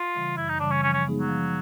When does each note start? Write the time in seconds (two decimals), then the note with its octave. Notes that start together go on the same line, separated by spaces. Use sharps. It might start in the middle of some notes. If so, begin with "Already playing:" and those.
Already playing: F4
0.15 C#3 E3 G3
0.37 F#2 E4
0.49 D#4
0.60 C#3 E3 G3 D4
0.72 C#4
0.83 F3 C#4
0.94 C#4
1.06 G#3 B3 D#4 G#4
1.18 F#3
1.28 F3